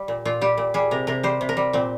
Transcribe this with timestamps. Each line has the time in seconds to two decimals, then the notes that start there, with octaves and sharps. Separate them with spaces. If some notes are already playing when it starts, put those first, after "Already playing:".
Already playing: G3
0.08 A#2
0.25 A#2 F4
0.41 G3 G4
0.58 A#2
0.74 G3 G#4
0.91 C3 A#4
1.07 C3 A#4
1.23 G3 C5
1.41 C3
1.49 A#4
1.57 G3
1.73 A#2 C4